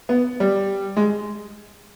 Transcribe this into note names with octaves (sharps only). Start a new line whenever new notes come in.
B3
G3
G#3